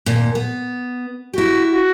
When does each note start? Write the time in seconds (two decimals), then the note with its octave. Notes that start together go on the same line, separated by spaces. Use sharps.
0.06 D#2 A#2
0.35 B3
1.34 E4 F#4 G4
1.71 F#4